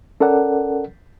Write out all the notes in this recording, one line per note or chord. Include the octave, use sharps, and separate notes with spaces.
C#4 A4 A#4 D5 F#5